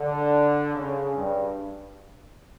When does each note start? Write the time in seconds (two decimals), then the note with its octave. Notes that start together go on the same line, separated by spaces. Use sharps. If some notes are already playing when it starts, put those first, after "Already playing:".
Already playing: D3
0.74 C#3
1.16 G2